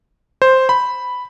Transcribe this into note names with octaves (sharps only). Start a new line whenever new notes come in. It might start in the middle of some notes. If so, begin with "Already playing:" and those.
C5
B5